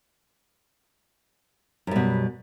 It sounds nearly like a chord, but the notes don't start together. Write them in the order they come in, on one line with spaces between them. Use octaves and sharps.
F#2 G3 B2